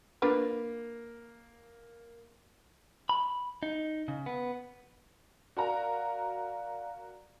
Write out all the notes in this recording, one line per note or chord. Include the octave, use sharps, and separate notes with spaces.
A#3 D4 F4 B4
B5
D#4
C#3
B3
F#4 A#4 D5 F5 A#5